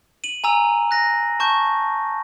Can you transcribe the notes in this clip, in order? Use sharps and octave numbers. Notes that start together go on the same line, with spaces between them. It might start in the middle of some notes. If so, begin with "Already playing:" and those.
D#7 F#7
G#5 A#5 E6
F#6 A#6
A5 C#6 G6